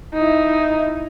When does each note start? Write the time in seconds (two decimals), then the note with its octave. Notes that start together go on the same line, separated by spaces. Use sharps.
0.13 D#4 E4